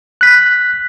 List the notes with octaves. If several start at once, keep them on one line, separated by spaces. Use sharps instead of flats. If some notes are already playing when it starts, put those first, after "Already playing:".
F#6 B6